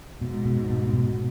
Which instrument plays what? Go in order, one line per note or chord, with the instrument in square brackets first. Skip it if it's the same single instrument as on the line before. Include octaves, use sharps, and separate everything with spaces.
[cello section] G#2 [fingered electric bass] B2
[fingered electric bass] B2
B2
B2